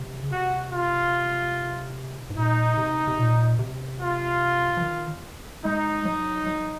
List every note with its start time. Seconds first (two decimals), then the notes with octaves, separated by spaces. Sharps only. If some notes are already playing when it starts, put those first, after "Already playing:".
Already playing: C3
0.23 C#3
0.31 C3 F#4
0.72 F4
2.30 G#2
2.36 A#2 D#4
2.77 C3
3.07 C3
3.18 A#2
3.59 C3
4.00 F4
4.77 F3
4.82 D#3
5.65 G#3 D#4
6.05 F#3
6.47 F#3